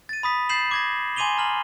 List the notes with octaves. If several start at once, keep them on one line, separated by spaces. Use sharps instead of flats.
A6 D#7
B5 D#6 B6
G6 A6 C7 E7 F#7
D6 G#6 A#6
G#5 C6 D6 D#7 F7 G7
A#5 F6 F#7